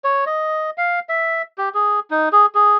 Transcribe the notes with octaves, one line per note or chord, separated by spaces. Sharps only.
C#5
D#5
F5
E5
G4
G#4
D#4
G#4
G#4